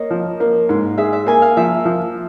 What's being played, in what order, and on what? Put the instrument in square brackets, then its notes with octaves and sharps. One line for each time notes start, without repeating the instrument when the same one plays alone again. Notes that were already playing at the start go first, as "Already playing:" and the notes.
Already playing: [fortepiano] A#3 [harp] C#5 D#5
[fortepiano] F3
A#3
G#2
[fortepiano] G#4 [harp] E5
[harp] E5
[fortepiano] A#3 [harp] G#5
[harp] F5
[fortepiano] F3 [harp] E5
[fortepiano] F3